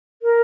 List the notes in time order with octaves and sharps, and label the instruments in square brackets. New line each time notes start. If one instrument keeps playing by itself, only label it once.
[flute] A#4